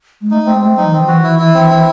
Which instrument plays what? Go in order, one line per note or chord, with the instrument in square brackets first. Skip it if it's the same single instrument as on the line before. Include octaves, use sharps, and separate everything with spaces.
[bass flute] G#3
[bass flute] A3 [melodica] D#4
[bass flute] A3
[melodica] C4
[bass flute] G#3
[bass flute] A3 [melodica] C4
[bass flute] F#3 [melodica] D#4
[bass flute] E3
[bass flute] D#3 [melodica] C4
[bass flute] F3
[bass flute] E3 [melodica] F#4
[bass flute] E3 [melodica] E4
[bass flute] E3 [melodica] E4
[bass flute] E3 [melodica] C4
[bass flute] E3 [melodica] E4